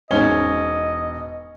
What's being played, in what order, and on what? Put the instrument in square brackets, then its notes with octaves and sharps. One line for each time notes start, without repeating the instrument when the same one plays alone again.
[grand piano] E1 G#4 G7 [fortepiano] C#4 [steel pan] D#4 C5 [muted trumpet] D#5